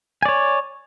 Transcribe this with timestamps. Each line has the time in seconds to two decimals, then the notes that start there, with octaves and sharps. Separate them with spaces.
0.22 G#5
0.25 D5
0.28 C#5